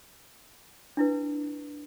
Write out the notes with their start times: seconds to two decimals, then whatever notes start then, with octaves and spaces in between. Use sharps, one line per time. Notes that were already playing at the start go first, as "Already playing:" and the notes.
0.97 D4 E4 B4